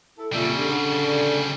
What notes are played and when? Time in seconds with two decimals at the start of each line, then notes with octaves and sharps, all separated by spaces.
0.18 E4 A4
0.33 F2 A#2 C#3 G3 E5
0.57 D3 G4
0.69 D3